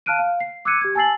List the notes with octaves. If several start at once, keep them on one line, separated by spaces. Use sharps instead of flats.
F5 A5 F6 F#6 D7 D#7
F5
C7
D6 E6 F#6 G#6 C#7 D#7
G4 G#6
G#5 A5 E6 A6 C7 F#7